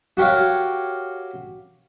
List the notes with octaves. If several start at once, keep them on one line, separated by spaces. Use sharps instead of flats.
F#4 G4 A#4 C#5 F5